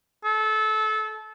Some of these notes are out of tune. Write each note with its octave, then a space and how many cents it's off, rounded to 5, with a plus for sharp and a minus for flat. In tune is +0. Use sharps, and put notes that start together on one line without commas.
A4 -25